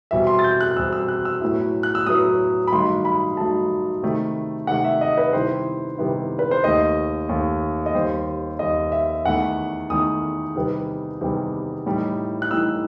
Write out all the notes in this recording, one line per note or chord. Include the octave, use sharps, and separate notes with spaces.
E2 B2 G3 C4 E5
C6
A6
G6
F#6
F#6
E2 B2 G3 C4 E6
E6
F#6
E6
A2 F#3 B3 E4
F#6
E6
A2 F#3 B3 E4 D#6
B5
G2 D#3 F#3 A3 D#4 C6
B5
G2 D#3 F#3 A3 D#4 A5
C3 D#3 A3
C3 D#3 A3 F#5
E5
D#5
B4
C3 D#3 G3 B3 E4 C5
C3 D#3 G3 B3 E4
B4
C5
D#2 D#3 A3 D#5
D#2 D#3 A3
D#5
D#2 D#3 G3 C5
D#2 D#3 G3 D#5
E5
E2 D#3 A3 F#5
E2 D#3 A3 D#6
E2 C3 D#3 G3 B3
E2 C3 D#3 G3 B3
A2 E3 G3 D#4
F#6
A2 E3 G3 D#4 E6